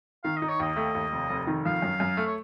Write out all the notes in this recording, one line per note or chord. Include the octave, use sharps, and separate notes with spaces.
D#3 F5
D#5
D#4
C#5
D#2 D#5
A3
D#2
F1
F1
D#3
F3 F5
F#2
F#2
A3
C#5